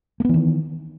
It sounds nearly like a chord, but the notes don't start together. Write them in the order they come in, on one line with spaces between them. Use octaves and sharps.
A#3 B3 E3 D#3